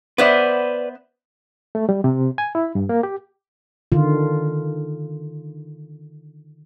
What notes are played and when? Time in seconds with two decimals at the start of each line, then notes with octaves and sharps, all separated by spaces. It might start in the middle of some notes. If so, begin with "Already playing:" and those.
0.18 B3 B4 C5 D5 E5
1.75 A3
1.89 G3
2.04 C3
2.38 G#5
2.55 E4
2.75 G2
2.89 A#3
3.03 G4
3.92 D3 D#3 F4